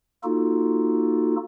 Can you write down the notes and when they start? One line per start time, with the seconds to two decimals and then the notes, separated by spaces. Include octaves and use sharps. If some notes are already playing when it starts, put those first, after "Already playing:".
0.24 A#3 D#4 F4 F#4 A4